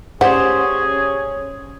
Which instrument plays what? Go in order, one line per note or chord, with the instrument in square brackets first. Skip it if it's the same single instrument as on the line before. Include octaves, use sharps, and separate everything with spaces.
[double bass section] C#4 [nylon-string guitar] G4 C5 D5 [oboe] G#4 [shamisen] F#5